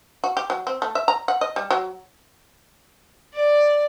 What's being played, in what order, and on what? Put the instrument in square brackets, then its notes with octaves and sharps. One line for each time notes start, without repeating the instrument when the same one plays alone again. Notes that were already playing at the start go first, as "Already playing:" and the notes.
[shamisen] F#4
G4
F#3
C4
A3
E5
A#5
F#5
D#5
G3
F#3
[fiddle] D5